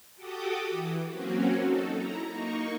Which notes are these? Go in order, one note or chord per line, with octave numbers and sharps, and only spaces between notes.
F#4 G4 A4 G5 D6 D#6
E3
F#3 A#3 C4 C#4 F#4
D#4 A4
E4 A#5
A#3 D#4 C#6